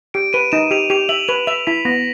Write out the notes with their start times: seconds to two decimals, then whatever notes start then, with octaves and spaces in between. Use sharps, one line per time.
0.14 G4 D7
0.33 B4 D#7
0.52 D#4 E7
0.71 G4 F7
0.90 G4 F7
1.09 E5 F#7
1.28 B4 F7
1.47 E5 F7
1.67 E4 B6
1.85 B3 A#6